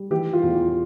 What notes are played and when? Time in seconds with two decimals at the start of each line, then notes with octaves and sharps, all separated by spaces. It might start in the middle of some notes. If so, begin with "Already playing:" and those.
Already playing: G3
0.10 E3 G4
0.33 F4
0.43 E2
0.55 F4